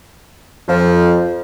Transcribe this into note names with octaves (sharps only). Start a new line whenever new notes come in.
F2 F3